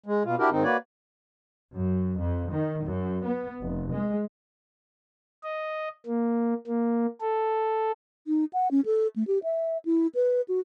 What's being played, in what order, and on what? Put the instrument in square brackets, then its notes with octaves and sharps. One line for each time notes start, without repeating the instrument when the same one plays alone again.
[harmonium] G#3
B2 F4
D4 E4 F#4 G4 A#4
G#2 D#3 C4 D#4
A#3 F#4 B4 C#5 D5
[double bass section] F#2
F2
D#3
F#2
B3
F1
G#3
[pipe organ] D#5
A#3
A#3
A4
[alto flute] D#4
F#5
C#4
A4
A3
G4
E5
E4
B4
F#4